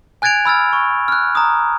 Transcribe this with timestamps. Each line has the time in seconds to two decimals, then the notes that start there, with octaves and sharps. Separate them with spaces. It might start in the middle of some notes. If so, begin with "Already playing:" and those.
0.22 G#5 F#6 G#6 A6 D7 F7
0.45 B5 E6 F6 A6
0.73 C#6
1.08 F6 F#6
1.35 A#5 D#6